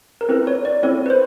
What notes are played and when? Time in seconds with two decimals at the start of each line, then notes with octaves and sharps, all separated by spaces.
0.21 A#4
0.29 C4 E4 A4 B4
0.47 C#5
0.65 D5
0.83 C4 E4 A4 C#5
1.06 B4
1.10 C5